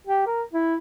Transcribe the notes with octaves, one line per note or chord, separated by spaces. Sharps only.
G4
A#4
E4